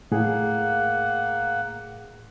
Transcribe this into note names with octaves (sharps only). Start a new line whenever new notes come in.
A2 A#3 G#4 F#5